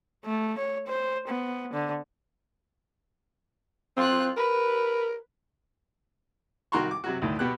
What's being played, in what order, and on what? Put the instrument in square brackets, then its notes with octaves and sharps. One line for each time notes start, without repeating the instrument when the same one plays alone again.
[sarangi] A3
C#5
C5
B3
D3
[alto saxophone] C4 [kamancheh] F4 F#6
[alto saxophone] A#4 [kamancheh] B4
[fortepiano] C2 D#3 F#4 A#5 C6 C#6
D6
C3 F#3 F#4
D2 A2 D#3
B2 B3 G4 F#6